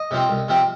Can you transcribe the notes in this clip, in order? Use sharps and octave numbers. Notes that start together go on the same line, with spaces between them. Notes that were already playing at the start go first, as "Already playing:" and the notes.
Already playing: D#5
C3 F3 C4
C2
C3 F3 C4